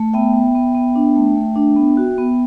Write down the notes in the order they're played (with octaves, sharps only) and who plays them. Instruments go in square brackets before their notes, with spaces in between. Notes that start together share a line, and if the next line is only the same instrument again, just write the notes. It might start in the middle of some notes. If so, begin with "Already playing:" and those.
Already playing: [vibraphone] A3
B3 E5 G5
B3
B3
B3
D4
A3
A3
D4
B3
F#4
B3